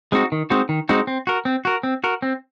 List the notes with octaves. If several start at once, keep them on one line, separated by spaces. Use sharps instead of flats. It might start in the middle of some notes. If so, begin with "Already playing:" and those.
G#3 C4 D#4 F#4
D#3
G#3 C4 D#4 F#4
D#3
G#3 C4 D#4 F#4
C4
F#4 A#4
C4
F#4 A#4
C4
F#4 A#4
C4